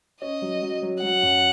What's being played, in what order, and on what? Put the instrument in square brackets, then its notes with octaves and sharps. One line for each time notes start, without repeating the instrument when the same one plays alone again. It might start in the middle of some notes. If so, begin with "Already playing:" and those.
[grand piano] C#4 [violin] D#5
[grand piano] F#3
F#3
F#3
[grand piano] F#3 [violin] F#5
[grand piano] F#2